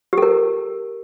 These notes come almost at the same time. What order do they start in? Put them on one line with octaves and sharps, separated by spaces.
G4 A4 A#4